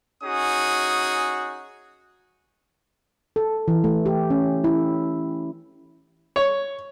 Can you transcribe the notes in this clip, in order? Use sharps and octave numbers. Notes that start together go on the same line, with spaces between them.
C#4 D#4 F#4 G#4 D#6
A4
E3
A3
G4
C#4
E4
C#5